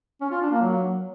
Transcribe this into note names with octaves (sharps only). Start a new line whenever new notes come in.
C#4
F4
D4
A#3
F#3